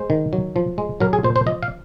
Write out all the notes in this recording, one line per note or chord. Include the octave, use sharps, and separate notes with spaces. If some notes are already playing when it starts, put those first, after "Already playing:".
Already playing: G#3 C5
D#3
F#3
F3
G#3
F#3 A#4
G#4
A#2 C5
C5
F3 D#5
F5